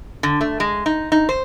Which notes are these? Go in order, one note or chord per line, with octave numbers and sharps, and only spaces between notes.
D3
A3
G#3
D#4
D#4
C5